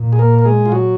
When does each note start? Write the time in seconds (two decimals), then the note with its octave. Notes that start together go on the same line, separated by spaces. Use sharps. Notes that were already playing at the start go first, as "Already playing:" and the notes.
Already playing: A#2
0.13 G#4
0.19 A#3 A#4
0.39 A#4
0.45 G#3 G#4
0.66 F4
0.72 F#3 F#4